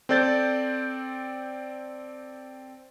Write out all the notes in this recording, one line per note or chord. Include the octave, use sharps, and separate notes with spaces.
C4 A4 D5 G6 A6